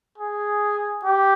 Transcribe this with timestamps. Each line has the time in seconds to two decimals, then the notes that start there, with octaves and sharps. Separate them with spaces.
0.18 G#4
1.04 G4